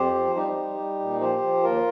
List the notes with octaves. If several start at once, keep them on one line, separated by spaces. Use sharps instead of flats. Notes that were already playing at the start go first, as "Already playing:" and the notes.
Already playing: F2 G4 C5
F3
G3 D#4 G4
G3
G3
A#2
F3 G4 C5
F3
D#2 F4 A#4